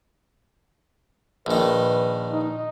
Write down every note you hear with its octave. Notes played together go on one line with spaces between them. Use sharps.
A#1 D#3 B4
D#4